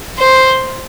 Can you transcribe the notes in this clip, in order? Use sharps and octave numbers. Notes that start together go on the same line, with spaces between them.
C5